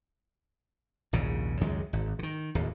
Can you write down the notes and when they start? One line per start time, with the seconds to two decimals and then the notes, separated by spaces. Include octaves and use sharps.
1.13 A#1 D#2 G#2 C#3
1.61 C#2 F#2 D#3 G#3
1.93 G#1
2.19 D3 D#3
2.55 D1 D#2